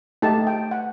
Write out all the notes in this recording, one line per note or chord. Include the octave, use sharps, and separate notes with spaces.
A3 D#4 G4 A5
G5
F#5